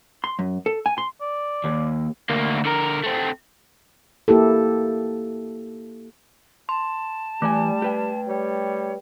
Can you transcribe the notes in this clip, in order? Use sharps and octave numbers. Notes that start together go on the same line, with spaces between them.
C6
F#2
A4
G#5
C6
D5
D#2
D2 A#3
D3 A#4
A3 C4
A#3 E4 G4 A4
A5 C6
E3 G3 A3 D5 G#5
G4 B4 G5
G3 C#5